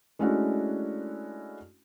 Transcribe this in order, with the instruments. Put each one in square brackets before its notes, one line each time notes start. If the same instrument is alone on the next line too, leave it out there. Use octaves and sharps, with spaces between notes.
[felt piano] G#3 A3 C#4 D4 E4 F#4